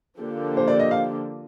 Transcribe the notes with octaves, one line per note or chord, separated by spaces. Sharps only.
D3 F3 A#3 D4 G4
C5
D5
D#5
F5